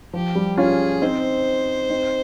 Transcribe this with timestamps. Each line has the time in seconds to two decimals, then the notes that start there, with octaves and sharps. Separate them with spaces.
0.13 F3 G4
0.35 G3
0.57 C#4 F4 G#4
1.02 C4 D#4 C5
1.90 C4 D#4